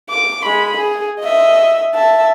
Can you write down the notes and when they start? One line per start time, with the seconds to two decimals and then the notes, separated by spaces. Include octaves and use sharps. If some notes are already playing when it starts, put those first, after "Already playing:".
0.10 D6
0.45 G#3 B5
0.77 G#4
1.19 D#5 E5
1.94 E5 A5